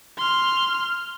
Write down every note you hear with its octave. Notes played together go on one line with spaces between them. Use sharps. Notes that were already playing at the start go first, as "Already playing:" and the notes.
C6 F6